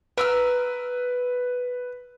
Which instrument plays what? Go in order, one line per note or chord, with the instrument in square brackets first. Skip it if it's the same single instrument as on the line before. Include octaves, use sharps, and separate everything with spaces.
[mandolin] A#4 E6 F6 [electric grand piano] B4